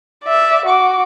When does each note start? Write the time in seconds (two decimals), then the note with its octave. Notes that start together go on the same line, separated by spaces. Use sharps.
0.25 D5 E5
0.65 F#4 D6